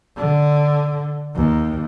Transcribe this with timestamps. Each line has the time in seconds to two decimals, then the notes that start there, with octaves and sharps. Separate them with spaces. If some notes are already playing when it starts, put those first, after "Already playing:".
0.17 D3
1.35 D#2